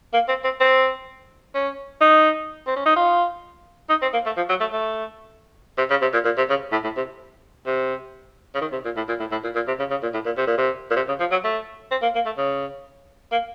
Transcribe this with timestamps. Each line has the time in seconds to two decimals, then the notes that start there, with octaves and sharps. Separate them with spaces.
0.14 A#3
0.28 C4
0.44 C4
0.60 C4
1.54 C#4
2.01 D#4
2.67 C4
2.76 C#4
2.86 D#4
2.96 F4
3.89 D#4
4.02 C4
4.13 A#3
4.26 A3
4.37 F3
4.49 F#3
4.60 A3
4.72 A3
5.78 C3
5.90 C#3
6.02 C3
6.13 A#2
6.25 A#2
6.37 C3
6.50 C#3
6.72 A2
6.84 A2
6.97 C3
7.66 C3
8.55 C#3
8.61 D#3
8.72 C3
8.85 A#2
8.96 A2
9.08 A#2
9.20 A2
9.31 A2
9.44 A#2
9.55 A#2
9.67 C3
9.79 C#3
9.90 C#3
10.03 A#2
10.14 A2
10.26 A#2
10.37 C3
10.47 A#2
10.58 C3
10.91 A#2
10.96 C3
11.08 C#3
11.20 F3
11.31 F#3
11.44 A3
11.91 C4
12.02 A#3
12.15 A#3
12.26 A3
12.37 C#3
13.32 A#3